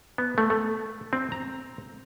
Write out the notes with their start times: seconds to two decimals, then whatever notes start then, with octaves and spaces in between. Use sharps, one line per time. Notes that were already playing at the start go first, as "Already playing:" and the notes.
0.18 B3
0.38 A3
0.50 A3
1.13 C4
1.32 A#5